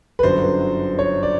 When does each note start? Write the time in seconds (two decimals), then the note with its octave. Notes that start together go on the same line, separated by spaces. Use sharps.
0.19 B4
0.23 G1 F#2 D3 F#3 C5
0.99 C#5
1.23 D5